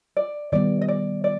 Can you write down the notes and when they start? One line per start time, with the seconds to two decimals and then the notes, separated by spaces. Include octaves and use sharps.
0.17 D5
0.52 D#3 G3 B3 D5
0.82 D#5
0.88 D5
1.24 D5